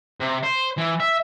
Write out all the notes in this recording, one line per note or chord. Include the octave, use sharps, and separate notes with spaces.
C3
C5
E3
E5